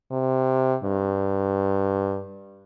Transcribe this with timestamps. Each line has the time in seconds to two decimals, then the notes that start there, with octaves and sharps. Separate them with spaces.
0.11 C3
0.83 G2